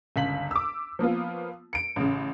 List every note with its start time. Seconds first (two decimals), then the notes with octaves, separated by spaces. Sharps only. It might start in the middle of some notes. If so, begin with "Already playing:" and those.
0.16 G1 C#2 B6 F#7
0.51 D6 E6
0.99 F3 A#3 B3 F4
1.73 C#7 D7
1.96 A1 C#3